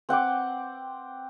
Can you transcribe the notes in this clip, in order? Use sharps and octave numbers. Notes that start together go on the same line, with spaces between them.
C4 F#5 G5 D6